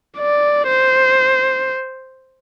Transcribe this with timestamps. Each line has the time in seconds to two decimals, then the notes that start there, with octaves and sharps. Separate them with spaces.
0.18 D5
0.68 C5